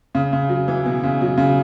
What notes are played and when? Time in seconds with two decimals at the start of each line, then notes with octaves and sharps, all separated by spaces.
0.15 C#3
0.33 C#3
0.49 F#3
0.68 E3
0.86 B2
1.03 C#3
1.21 F#3
1.37 C#3